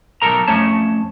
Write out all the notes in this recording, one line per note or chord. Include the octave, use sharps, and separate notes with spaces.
B1 F#2 A4 A#4 A#5
F2 A3 C#4 C#5 A5